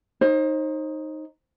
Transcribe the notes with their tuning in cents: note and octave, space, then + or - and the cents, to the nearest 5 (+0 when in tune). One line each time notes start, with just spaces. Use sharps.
D#4 +0 C5 +35